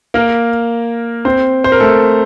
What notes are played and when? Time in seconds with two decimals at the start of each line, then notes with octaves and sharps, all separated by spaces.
0.14 A#3 A#4
1.25 C4 C5
1.64 C5
1.72 A#4
1.80 A3 A4